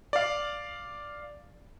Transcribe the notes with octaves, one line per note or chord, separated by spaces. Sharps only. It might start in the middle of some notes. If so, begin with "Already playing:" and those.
D5 F5